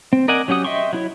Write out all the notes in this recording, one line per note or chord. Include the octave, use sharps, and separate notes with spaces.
C4
A#4 D5 D#5 F#5 G#5
F#3 C#4 G4 F#5 D#6
D#5 E5 G5 C6 C#6
F#3 E4 C#5